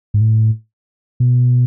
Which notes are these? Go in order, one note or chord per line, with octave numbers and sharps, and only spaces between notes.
G#2
A2
B2